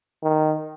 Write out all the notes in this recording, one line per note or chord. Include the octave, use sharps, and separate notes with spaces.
D#3